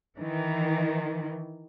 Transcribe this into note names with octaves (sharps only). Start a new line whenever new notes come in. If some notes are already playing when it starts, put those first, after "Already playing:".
D#3 E3